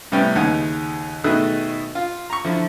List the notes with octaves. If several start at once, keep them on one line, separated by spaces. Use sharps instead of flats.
A2 C3 G3 B3 C#4 G5
D#2 C#3 D#4 F#5 G#5
B2 D#3 A3 G#4 E5 F#6
F4
A#5 C#6
D3 F3 E4